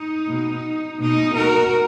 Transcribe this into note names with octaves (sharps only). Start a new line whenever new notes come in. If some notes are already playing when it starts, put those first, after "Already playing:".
Already playing: D#4
B2
B2 D#4
F#4 A#4